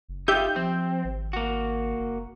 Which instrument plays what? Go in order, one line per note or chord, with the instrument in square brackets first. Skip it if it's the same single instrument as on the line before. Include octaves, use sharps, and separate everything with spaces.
[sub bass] F#1
[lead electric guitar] D#4 F4 [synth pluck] G4 E5 G6
[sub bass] F3 [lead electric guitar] C4
[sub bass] G#1
[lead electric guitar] A#3 F#4
[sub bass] F#1